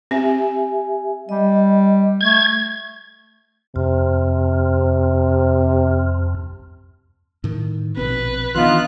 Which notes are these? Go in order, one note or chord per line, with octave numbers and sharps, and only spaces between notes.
C4 G4 E5 G#5
G3 D#5
A3 G#6
F2 C3
A2 D#3
A#1 B2 C4 B4
D#3 E3 B3 D4 D#4 F4 F#6